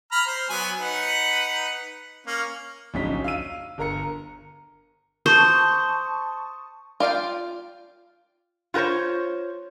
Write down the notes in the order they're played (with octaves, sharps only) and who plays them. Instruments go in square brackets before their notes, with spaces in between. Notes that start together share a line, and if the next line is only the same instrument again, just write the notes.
[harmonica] A#5 B5 F6
C5
F#3 B3 G#5
D#4 B4 F#5
A#3 C#4
[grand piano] D1 A#1 F#2 C#4 D#4 B6
F5 E6 D#7
G1 A#4 A#5 C#7
[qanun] C5 [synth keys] A5 C#6 D#6
[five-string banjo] F4 D5 F5 G5
[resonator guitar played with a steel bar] F4 F#4 A#4 C5 C#5